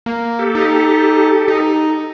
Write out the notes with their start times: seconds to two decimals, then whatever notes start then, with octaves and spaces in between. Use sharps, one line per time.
0.06 A#3
0.39 G4 A4
0.55 D#4
1.48 D#4